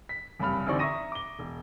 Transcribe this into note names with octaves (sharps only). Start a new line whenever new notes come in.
B6
F#1 C2 G2 B5 F6
A1 D3 C4 D#4 D5 C#6
E5 A#5 C#6 D#6 A#6 D#7
D6 G7
E1